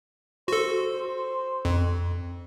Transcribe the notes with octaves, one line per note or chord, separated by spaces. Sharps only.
F#4 A4 C5
F2